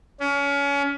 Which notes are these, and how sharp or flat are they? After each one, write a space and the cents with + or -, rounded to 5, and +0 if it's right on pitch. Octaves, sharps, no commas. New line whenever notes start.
C#4 +30